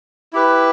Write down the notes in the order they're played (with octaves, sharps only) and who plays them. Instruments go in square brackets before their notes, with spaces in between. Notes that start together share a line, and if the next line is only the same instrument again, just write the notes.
[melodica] E4 G4 B4